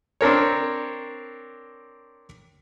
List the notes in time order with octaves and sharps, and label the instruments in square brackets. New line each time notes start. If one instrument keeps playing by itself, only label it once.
[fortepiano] C4 D4 A#4 C#5